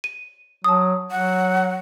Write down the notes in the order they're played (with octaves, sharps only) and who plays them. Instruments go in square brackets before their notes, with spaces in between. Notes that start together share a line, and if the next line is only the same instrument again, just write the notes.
[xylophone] D#7
[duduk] F#3 [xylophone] A5 D#6
[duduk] F#3 [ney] F#5